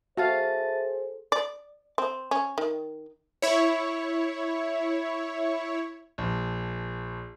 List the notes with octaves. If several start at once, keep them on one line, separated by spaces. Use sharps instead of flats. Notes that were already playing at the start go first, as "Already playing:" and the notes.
F#4 G#4 A4 C5 E5 F5 A5 A6
D5
C4
C#4
D#3
E4 C#5
A#1